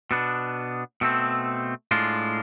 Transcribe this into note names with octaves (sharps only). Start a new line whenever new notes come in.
B2 B3 D4
B2 A3 C4
A2 G#3 D4 F4